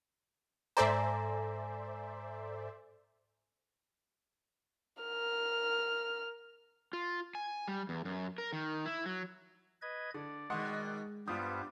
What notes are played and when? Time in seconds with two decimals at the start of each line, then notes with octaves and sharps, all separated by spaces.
0.77 G#2 A4 C5 D5 E5 G#5 A#5
5.03 A#4 F6
6.93 F4
7.35 G#5
7.68 G3
7.89 E2
8.05 F#2
8.38 A#4
8.53 D#3
8.85 E4
9.06 F#3
9.82 B4 D#5 G#6
10.14 D3 D5
10.50 B2 D#3 G#3 D#5 F#5 C6
11.28 G2 G3 B3 F4 C5 D#6